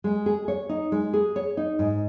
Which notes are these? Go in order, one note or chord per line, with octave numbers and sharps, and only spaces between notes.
G#3
G#4
C#5
D#4
G#3
G#4
C#5
D#4
G#2